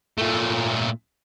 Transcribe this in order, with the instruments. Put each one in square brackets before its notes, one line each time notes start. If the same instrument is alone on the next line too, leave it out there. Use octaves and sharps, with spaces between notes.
[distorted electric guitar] A#2 A3